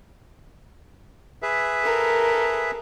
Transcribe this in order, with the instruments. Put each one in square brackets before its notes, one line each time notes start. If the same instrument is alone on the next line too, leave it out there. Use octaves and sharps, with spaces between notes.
[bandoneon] G#4 B4 E5
[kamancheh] A4 A#4